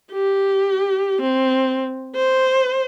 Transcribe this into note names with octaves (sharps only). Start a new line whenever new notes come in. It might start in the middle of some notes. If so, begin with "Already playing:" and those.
G4
C4
C5